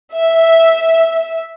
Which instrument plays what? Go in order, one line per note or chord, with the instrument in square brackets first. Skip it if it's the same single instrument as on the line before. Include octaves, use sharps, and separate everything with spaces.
[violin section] E5